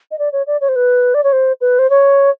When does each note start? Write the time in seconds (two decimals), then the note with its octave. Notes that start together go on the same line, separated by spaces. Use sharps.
0.11 D#5
0.19 D5
0.32 C#5
0.47 D5
0.61 C#5
0.68 C5
0.76 B4
1.14 D5
1.24 C#5
1.32 C5
1.61 B4
1.79 C5
1.90 C#5